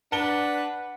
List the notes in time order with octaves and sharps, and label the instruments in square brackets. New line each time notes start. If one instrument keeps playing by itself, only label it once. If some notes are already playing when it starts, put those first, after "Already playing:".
[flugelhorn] D4 [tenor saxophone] B4 [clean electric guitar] F#5 [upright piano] A5 G7